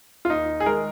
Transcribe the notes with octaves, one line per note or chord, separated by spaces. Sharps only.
F4
D#2 D#4
G#4
D#3 G#3 A#4